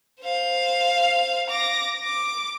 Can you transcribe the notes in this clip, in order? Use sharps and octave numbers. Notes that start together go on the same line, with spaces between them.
C5 F5
D6 A#6
D6